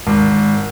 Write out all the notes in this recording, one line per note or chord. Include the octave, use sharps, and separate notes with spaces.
G#1